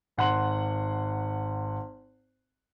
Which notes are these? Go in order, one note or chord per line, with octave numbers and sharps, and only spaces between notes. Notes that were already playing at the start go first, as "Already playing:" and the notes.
G#1 F#5 C6 F#7